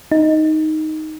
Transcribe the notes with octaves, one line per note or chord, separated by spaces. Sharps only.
D#4